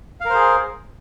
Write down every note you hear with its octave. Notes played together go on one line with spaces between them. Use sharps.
G#4 A#4 C5 F5